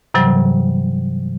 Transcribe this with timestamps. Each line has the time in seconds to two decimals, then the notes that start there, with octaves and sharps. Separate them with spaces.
0.14 G2 C3 E3 F#3 G3